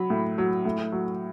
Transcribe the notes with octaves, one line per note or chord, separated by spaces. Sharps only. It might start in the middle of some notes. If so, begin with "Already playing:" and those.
Already playing: F#3 B5
A2
F#3
A2
F#3